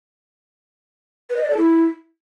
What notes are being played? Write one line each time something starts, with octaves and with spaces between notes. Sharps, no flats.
B4
D#5
D5
A4
E4